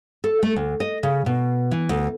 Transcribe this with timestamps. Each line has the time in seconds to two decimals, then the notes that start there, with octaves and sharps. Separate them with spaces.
0.24 A4
0.43 A3
0.56 D2
0.80 D#5
1.03 C#3
1.26 B2
1.71 E3
1.89 D2